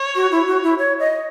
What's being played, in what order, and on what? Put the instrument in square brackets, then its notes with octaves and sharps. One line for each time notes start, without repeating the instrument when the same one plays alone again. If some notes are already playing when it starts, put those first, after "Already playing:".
Already playing: [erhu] C#5
[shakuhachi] F#4
E4
F#4
E4
C#5
D#5